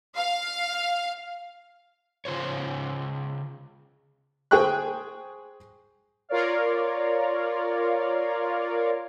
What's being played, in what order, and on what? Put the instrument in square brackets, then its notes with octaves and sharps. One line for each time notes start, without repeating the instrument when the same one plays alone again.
[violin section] F5
[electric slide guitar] C#3 F4 C5 C#5
[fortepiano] G#4 C5 G5 C#6 F#6
[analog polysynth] F4 A#4 C#5 D5 F5